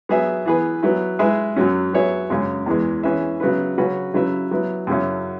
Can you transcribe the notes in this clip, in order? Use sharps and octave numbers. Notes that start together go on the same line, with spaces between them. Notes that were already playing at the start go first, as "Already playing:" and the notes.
F#3 B3 G#4 E5
E3 B3 G#4 B4
F#3 B3 E4
G#3 E4 G#4 B4 E5
F#2 F#3 C#4
F#3 B3 G#4 C#5 E5
F#2 C#3 G#3 C#4
E2 E3 G#3
E3 C#4 G#4 B4 E5
C#3 F#3 B3 E4 B4
C#3 F#3 C#4 F#4 B4
C#3 F#3 E4 B4 E5
F#3 B3 E4
F#2 C#3 F#3 C#4 E4